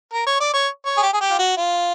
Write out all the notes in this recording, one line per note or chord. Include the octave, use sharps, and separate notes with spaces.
A#4
C#5
D5
C#5
C#5
G#4
G4
G#4
G4
F4
F#4
F4